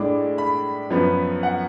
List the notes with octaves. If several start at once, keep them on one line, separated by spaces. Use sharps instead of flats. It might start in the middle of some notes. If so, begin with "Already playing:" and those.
Already playing: A2 G#3 D4 D6
B5
F#2 F3 B3
F#5